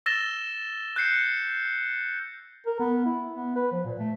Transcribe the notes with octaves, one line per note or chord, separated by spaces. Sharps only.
E6 A6 A#6 E7 G7
F#6 G6 C7 C#7
A#4
B3
E4
B3
B4
F3
A#2
A3